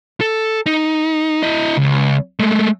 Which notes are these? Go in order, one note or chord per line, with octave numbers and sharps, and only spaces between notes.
A4
D#4
E4 D#5
C#2
G#3 A3